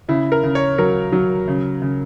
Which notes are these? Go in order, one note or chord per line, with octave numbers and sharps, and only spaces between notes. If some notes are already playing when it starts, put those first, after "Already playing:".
C#3 E4
A#4
C#3
C#5
F#3 A#4
F#3
C#3
C#3